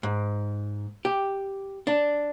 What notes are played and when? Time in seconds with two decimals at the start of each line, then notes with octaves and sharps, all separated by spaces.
0.03 G#2
1.05 G4
1.87 D4